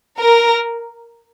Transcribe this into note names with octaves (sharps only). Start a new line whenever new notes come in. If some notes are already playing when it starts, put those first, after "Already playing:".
A#4